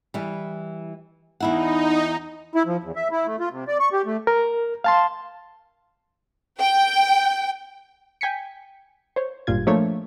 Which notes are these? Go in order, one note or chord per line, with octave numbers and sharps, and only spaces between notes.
E3 G3
E2 D#4 E4 F#5
E4
F3
E2
E5
E4
A3
F4
C3
D5
C#6
G4
A3
A#4
F5 A5 C6
G5
G5 G#5 B6 C#7
C5 C#5
G#1 G2 A#2 F4 G#6
F3 A3 A#3 D4 C#5